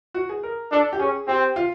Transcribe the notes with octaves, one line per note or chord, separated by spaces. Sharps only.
F#4
G#4
A#4
D4 A4
G4
C#4 G#4
C4 G4
F4